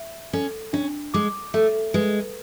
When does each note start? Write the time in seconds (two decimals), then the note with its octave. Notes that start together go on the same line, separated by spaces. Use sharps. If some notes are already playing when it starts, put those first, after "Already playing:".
Already playing: E5
0.33 C#4 A4
0.73 C#4 D4
1.14 G#3 D6
1.54 A3 E5
1.94 G#3 B4